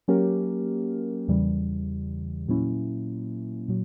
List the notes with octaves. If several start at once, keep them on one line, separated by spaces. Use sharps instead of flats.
F#3 A#3 C#4 G4 A#4
E2 C#3 E3 G3
A#2 F#3 A#3 C#4 E4
A#2 F#3